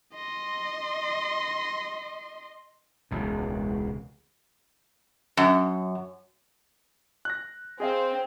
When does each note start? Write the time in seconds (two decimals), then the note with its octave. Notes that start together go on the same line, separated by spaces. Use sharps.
0.15 D#5 C6
3.11 E1 C#2 B2
5.37 F#2
7.25 F#6 A#6
7.80 C4 G#4 D#5 F5